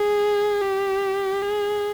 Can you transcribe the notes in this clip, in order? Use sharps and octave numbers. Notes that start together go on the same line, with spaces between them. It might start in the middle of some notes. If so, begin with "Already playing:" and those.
Already playing: G#4
G4
G#4